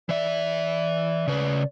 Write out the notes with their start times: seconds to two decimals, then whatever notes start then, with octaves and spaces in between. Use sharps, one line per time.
0.09 E3 D5 E5
1.28 C#3 B4